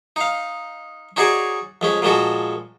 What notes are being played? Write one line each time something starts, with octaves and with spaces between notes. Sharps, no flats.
D#4 F5
C#4 D#4 F#4 G#4 D5 G#5
F2 G#3 C#4
A#2 F3 G#3 F#4 A4